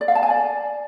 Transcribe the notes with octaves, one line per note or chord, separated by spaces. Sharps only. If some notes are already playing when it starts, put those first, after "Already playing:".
D5
F5
A5
G#5
D5